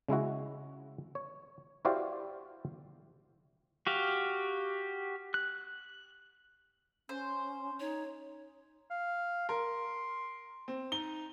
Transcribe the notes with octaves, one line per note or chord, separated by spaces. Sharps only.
C#3 G#3 E4 F#4
C#5
E4 F#4 G4 C5 D5 F5
F#4 G4 F5
F#6
C#4 C5
D#4 C#5
F5
A#4 C6
C4
D#4 G7